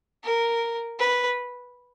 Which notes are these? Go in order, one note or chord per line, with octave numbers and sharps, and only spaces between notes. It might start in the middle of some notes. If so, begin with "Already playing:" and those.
A#4
B4